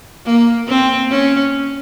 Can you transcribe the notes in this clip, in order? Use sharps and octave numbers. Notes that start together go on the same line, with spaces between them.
A#3
C4
C#4